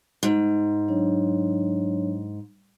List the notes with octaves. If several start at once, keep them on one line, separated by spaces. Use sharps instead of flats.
G#2
F#3 D4 C#5